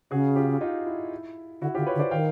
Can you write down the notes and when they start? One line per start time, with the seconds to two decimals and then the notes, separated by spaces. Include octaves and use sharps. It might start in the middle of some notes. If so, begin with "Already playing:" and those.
0.11 C#3 F#4 G#4
0.36 F4 G4
0.61 D#4 F4
0.86 E4
1.61 D3 E4 F#4
1.75 D3 F4 G4
1.86 B4 C#5
1.95 D3
1.99 C5 D5
2.11 D#3 F5 G5